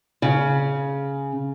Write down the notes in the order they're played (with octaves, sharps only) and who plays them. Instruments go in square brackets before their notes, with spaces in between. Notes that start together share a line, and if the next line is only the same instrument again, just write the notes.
[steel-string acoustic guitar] C#3